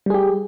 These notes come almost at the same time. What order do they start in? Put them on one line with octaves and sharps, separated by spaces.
G3 G#4 G4